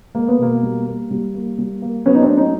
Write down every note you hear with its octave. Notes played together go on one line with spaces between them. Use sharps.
G#3 A#3
B3
B2 A#3
G3
A#3
G3
A#3
G3
A#3
F#3 B3 C#4
D#4
C4 D4
A3
C#4 D#4